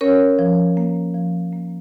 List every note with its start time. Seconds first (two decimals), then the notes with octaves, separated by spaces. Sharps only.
0.01 C#4 A#4 C#5
0.39 F3
0.77 A#3
1.15 F3
1.53 A#3